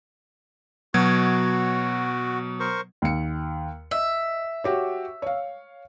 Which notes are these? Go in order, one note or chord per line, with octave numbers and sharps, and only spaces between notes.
B2 F#3 F#4 G#6
A#4 C5 C#6
D#2 C#7
D#5 E5
F#4 G4 C#5
C#5 F5